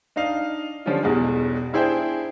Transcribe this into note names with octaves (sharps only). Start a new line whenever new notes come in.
D4 D#4 D#5 F5
D3 F3 G3 C#4 D4 F4
B1 E2 B2 G3 G#3
D4 E4 G#4 C5 E5 G5